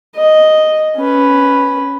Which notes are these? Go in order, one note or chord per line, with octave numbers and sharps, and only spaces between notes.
D#5
C#4 B4